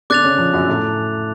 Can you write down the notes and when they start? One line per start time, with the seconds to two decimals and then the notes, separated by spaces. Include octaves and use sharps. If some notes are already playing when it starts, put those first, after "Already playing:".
0.10 D3 D4 D6 F#6 A6 F7
0.24 C#3 C#4
0.38 F3
0.53 F#2 F#3
0.68 A2 A3